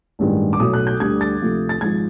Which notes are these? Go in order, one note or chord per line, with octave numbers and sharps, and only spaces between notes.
A1 G2 D#3 G#3
D6
B1 A2 F#3 A3 D#6
F#6
G6
D2 D3 G3 G#6
A6
D2 C3 F3 A3
A6
G#1 G#2 F3 G#3 G#6